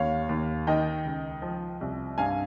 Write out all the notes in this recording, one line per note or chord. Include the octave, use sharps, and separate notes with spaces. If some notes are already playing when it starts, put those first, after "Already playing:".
Already playing: D#2 C#5 F5
D#2
D#3 D#5 G5
C#2
F3
C2
G2 F5 G#5